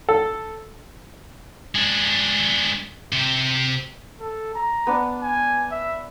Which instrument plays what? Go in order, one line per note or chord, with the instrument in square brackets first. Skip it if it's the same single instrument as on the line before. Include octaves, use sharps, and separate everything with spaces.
[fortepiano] A4
[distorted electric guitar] G#3 D4
C3 C5
[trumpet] A4
A#5
[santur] B3 D4
[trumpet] G#5
E5